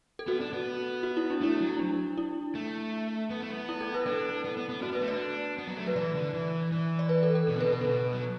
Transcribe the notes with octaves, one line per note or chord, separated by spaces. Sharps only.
A4
B3 F#4
D4
B3
F#4
E4
D4
A3 E4
F#3
D4
E4
A3
B3
A3
B3
E4
A4
B4
D4 A4
B3
B3
B3
D4 F#4
B3 B4
A3
D4 D5
B3
F#3
A3
F#3 B4
E3 D5
D3
E3
E3
D5
B4
A4
A4
B2
D3
B2 B4
B4
D3
B2
F#3